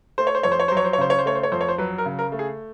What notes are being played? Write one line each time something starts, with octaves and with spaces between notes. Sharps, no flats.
A3 C5
C#5
C5
F2 C#5
C5
C#5
F#3 C5
C#5
C5
C#5
C#3 C5
C#5
C5
A3 C#5
C5
C#5
F2 C5
C#5
C5
F#3 B4
A#4
C#3
A#4
A3
G#4